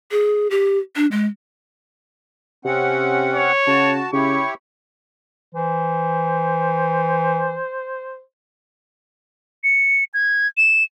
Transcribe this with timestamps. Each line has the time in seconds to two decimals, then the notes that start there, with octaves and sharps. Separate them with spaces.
0.11 G#4
0.51 G4
0.96 D4
1.12 G#3
2.65 C3 C4 C#4 F#5
3.35 C#5
3.67 C#3 F#4 A5
4.13 C#3 E4 G4 C#5 C#6
5.55 E3 C5
9.64 C#7
10.14 G#6
10.57 E7